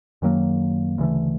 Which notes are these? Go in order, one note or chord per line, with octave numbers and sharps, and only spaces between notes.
F#2 D#3 F#3 A#3
D2 C#3 E3 A3